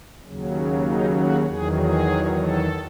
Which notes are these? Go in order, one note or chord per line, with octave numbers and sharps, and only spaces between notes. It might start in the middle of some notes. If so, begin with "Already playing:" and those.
D#2 C#3 F#3
D#4
F#4
E2 D#3 F#3 G#4
G#4
A4